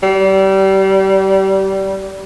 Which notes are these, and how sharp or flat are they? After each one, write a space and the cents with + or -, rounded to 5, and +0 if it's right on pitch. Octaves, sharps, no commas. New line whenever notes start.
G3 -25